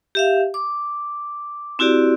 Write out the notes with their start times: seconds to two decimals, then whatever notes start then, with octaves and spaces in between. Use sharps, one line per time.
0.15 G4 E5 F5
0.54 D6
1.79 C4 E4 F#4 G4 D5